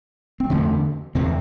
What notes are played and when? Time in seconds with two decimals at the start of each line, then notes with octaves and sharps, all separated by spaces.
0.40 C4
0.50 E2 D3 A3
1.15 E2 C3 C4